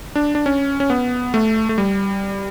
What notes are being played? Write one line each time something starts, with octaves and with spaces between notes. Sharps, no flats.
D4
D4
C#4
C#4
B3
A3
A3
G3